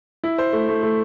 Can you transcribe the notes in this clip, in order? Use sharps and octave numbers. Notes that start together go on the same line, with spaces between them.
E4
C5
A3
A3
A3